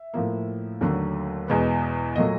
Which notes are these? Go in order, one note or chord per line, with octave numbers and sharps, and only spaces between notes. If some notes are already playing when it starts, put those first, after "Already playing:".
Already playing: E5
A2 F3 A#3
D#2 D3 F#3 A3
E2 B2 G#3 B3
A#2 F#3 A3 D#5